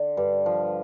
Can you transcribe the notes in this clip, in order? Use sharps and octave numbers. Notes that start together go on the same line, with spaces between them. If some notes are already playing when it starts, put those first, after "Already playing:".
Already playing: D3
G2
F3